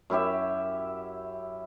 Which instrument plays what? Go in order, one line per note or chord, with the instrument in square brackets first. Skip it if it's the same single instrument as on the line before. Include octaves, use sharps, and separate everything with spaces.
[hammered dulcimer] F#2 E4 G4 E5